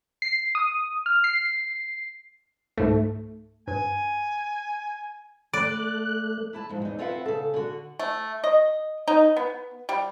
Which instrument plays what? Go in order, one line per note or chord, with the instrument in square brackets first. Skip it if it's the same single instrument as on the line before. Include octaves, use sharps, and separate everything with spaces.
[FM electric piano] C7
D#6
F6
C7
[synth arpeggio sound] C#2 G#2 [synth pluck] A3
[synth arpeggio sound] G2 [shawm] G#5
[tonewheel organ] A3 F#6 [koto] D5
[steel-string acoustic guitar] A3 E4 A5
G#2 F3
E2 D#4
C4 F4 B4 E5 F#5
C#3 A4
D3 F#4
[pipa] A3
D#5
D#4
B3
G3